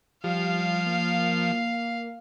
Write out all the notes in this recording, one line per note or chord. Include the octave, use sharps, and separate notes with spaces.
F3 G3 F5
A#3